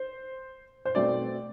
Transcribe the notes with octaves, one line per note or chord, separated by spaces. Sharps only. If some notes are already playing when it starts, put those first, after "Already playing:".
Already playing: C5
C5
B2 A3 C4 D5